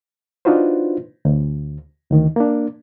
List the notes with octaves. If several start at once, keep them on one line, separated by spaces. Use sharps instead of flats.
D4 D#4 F4 F#4 B4 C5
D2
D2 D#3
A#3 D4